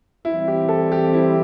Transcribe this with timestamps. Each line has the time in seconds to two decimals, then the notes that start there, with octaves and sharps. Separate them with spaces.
0.25 E3 G3 C4 E4
0.48 G4
0.69 A4
0.92 G4
1.13 E4